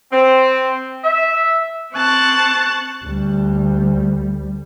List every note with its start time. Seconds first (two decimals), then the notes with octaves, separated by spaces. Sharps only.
0.11 C4
1.03 E5
1.95 C4 A5 C#6 F#6
3.05 D2 G3